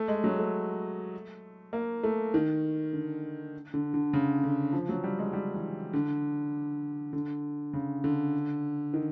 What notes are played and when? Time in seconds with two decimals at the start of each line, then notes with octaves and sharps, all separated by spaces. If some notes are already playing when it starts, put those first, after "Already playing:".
Already playing: A3
0.08 G#3
0.24 F#3
0.39 A3
1.73 A#3
2.03 A3
2.34 D#3
2.93 D3
3.74 D3
3.94 D3
4.13 C#3
4.44 D3
4.73 F3
4.89 F#3
5.04 G3
5.19 G#3
5.33 G3
5.54 E3
5.93 D3
7.13 D3
7.73 C#3
8.04 D3
8.94 D#3